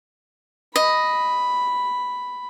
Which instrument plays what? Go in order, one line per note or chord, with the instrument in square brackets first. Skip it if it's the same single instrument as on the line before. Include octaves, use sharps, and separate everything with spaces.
[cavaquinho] D#5 [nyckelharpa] B5